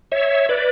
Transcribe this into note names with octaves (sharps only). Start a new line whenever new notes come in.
C#5 E5
B4 D5